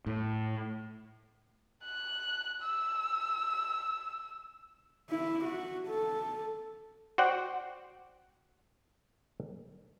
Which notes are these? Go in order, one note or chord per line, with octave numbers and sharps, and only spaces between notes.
A2
F#6
E6
E4
F#4
A4
F#4 C5 D5 F#5 G5